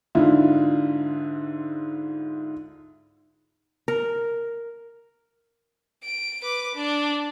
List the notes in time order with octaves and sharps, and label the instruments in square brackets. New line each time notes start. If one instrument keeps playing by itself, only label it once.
[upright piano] G#2 D3 E4 F4
[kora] A#4
[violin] D7
B4 D6
D4